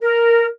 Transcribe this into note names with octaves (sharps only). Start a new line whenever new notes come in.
A#4